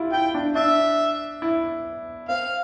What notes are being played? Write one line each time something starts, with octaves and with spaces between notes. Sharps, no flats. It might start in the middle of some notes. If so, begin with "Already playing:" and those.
Already playing: E4 F4 G4
E4 G5
D4
D4 E5
E4
C4 F5